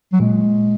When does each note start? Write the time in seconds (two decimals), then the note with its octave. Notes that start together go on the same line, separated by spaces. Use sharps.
0.13 F#3
0.20 A#2 G#3